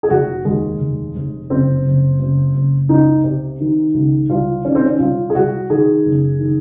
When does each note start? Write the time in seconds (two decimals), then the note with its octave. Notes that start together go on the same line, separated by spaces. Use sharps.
0.03 G#4
0.10 F1 F#4
0.45 D#2 G#3
0.80 F1
1.15 F1
1.49 F#1 C4
1.84 F#1
2.19 F#1
2.55 F#1
2.89 C#2 D#4
3.24 C3
3.60 D#3
3.94 C#2
4.30 C2 F4
4.65 D#3 C#4
4.75 C4
4.86 C#4
4.99 C2 F4
5.30 G#4
5.35 C2 F#4
5.70 D#3 G#4
6.05 F#1
6.40 D#3